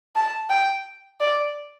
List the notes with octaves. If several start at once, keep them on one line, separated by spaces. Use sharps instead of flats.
A5
G5
D5